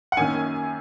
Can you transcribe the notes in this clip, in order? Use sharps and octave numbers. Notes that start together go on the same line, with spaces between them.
F#5
F#2 D#3 A#3 C#4 G#5